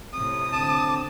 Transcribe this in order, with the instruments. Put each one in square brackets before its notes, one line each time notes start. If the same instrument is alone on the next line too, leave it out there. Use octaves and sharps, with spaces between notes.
[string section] A2 C3 [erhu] D#6
[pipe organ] D3 C4 [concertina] A5